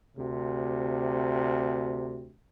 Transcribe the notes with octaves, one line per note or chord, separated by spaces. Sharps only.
D2 C3